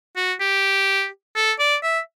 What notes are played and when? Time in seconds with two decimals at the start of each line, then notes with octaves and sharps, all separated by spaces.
0.16 F#4
0.40 G4
1.35 A4
1.59 D5
1.83 E5